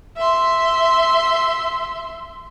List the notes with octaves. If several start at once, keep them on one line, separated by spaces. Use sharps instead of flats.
E5 C6